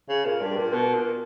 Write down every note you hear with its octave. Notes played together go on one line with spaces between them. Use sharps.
C#3
A#2
G2
A#2
B2
A#2